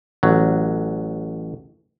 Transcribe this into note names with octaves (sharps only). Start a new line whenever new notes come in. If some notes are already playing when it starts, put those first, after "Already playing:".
A1 F#3